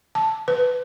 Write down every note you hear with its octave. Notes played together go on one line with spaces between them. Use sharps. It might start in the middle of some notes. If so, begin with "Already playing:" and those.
A5
B4